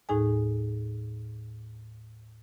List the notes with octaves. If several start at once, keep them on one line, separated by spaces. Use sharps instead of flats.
D#2 A2 D#4 G#4 G#5